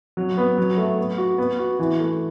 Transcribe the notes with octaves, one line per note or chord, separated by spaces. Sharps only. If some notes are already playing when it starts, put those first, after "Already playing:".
F#3
B3
F#3
A3
B3
F#4
B3
F#4
E3
A3